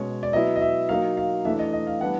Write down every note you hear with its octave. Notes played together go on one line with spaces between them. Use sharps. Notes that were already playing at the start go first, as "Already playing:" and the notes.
Already playing: B2 G#3 C#4 C#5
D5
F#3 B3 E4 D#5
D#5
E5
F#3 A#3 D#4 F5
F5
E3 A3 D4 E5
D#5
D#5
F5
E3 G3 B3 D4 F#5